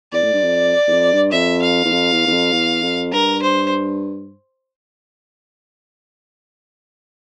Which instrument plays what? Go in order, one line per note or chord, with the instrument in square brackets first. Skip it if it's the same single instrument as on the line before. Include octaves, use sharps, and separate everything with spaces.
[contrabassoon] E2 [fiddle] D5
[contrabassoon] A2
G2
F2
E2
F2
G2
[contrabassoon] F2 [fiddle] E5
[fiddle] F5
[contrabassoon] E2
F2
E2
E2
F2
E2
F2
[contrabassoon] G2 [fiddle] A#4
[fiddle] C5